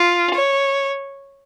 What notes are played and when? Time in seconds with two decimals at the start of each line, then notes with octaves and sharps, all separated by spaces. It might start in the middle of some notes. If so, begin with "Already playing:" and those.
Already playing: F4
0.35 C#5